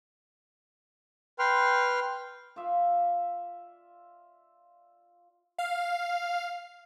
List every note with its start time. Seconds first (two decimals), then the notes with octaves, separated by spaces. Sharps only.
1.39 B4 G5 C6 F6
2.56 F4 D5 E5
5.58 F5